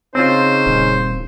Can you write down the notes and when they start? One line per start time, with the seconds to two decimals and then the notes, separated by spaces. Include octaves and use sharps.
0.15 C#3 C4 C#4 D#4 F4 C5
0.66 D#1